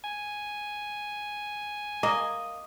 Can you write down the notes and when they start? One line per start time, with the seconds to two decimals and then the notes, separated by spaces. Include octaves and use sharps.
0.04 G#5
2.03 A#3 D#5